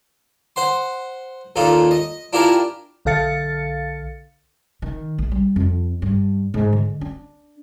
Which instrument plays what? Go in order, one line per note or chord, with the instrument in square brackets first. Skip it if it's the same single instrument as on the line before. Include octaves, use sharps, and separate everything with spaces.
[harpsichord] C5 F#5 C6
D#2 A#2 D#4 F4 A4
D#5
D4 E4 F4 G4 A#4 G#5
[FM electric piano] B1 D3 A4 F5 A6 C#7
[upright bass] D#3
A#1
G3
F2
G2
G#2
D3
D4